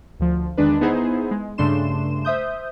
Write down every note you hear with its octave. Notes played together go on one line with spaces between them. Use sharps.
D2 F3
E2 D#3 G#3 D4 B4
B3 D#4 E4 G#4 C5
G#3
G2 C#3 A3 D4 C6 E7
C5 E5 D#6 G6